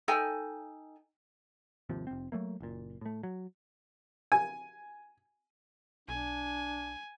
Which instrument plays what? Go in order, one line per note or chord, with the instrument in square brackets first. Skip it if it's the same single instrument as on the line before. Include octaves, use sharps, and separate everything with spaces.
[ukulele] D#4 A4 G5 G#5
[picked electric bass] G#1 D#2 C3 F3
F1 C4
F#3 A3 A#3
F#1 A#2
A2 A3
F#3
[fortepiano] G#5
[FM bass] B1 [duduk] D4 [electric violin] G#5